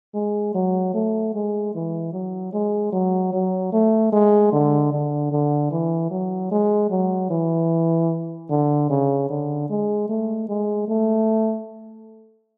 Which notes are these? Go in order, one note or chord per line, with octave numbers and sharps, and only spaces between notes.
G#3
F#3
A3
G#3
E3
F#3
G#3
F#3
F#3
A3
G#3
D3
D3
D3
E3
F#3
G#3
F#3
E3
D3
C#3
D3
G#3
A3
G#3
A3